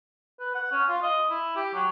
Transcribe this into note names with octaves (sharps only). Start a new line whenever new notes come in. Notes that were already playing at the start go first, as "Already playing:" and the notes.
B4
F#5
C#4
F4
D#5
E4
G4
F#3